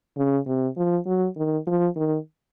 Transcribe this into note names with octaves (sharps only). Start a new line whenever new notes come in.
C#3
C3
F3
F#3
D#3
F3
D#3